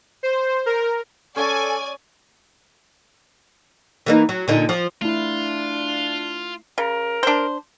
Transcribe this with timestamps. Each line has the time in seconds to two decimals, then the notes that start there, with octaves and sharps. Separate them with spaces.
0.23 C5
0.66 A#4
1.36 C#4 G#4 A4 D5 G#5
4.06 E3 A#3 D#4
4.29 F#3
4.48 A#2 D3 D#4
4.69 F3
5.02 A3 D4 E4 F4
6.78 C#3 A#4
7.23 D4 C5